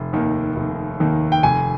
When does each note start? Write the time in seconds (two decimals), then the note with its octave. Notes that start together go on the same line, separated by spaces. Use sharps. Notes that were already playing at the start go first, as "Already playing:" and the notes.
Already playing: F1
0.13 D#2 D#3 A#3
0.56 F1
1.00 D#2 D#3 A#3
1.32 G5
1.43 F1 G#5